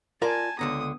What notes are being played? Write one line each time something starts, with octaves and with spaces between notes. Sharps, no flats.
F4 A#4 D5 G#5 A5
C#2 D3 B3 A#5 D#6